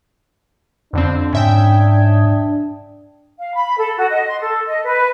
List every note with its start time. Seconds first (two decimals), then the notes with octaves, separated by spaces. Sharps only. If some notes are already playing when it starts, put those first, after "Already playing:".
0.93 F2 D3 C4 D4
1.33 G#2 C#3 E5 G5
3.39 F5
3.55 B5
3.78 A4
3.98 F#4
4.10 D#5
4.27 C6
4.41 A4
4.68 D#5
4.85 B4